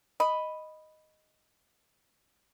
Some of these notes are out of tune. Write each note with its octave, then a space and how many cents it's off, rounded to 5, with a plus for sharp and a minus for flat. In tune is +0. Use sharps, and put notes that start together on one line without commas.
D#5 +0 B5 +0